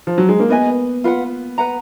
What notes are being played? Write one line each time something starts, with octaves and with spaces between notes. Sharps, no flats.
F3
F#3
G#3
A#3
B3 B4 D#5 G#5
F4 B4 F#5
B4 F#5 A#5